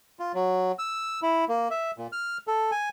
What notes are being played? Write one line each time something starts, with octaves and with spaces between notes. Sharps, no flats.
F4
F#3
E6
E4
A#3
E5
A#2
F6
A4
G#5